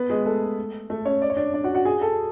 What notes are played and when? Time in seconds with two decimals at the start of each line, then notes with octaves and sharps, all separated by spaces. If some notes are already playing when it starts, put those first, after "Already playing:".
Already playing: B3 B4
0.10 G#3 G#4
0.26 A3 A4
0.90 A3 A4
1.05 C#4 C#5
1.22 D5
1.30 C#5
1.37 D4 D5
1.54 D4 D5
1.64 F#4 F#5
1.75 F#4 F#5
1.85 G#4 G#5
2.01 A4 A5